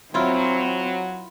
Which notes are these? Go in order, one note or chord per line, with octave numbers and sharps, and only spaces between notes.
F#3 C4 E4 F4 A#4